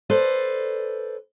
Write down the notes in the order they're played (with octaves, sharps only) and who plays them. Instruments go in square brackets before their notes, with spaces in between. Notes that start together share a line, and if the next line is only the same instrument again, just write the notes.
[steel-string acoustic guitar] A4 B4 C5 D5